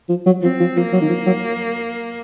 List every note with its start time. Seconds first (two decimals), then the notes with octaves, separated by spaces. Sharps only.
0.09 F3
0.26 F#3
0.43 F3 C4
0.60 F3
0.76 F3 A#3
0.93 F#3
1.02 D#3
1.09 F3
1.26 F#3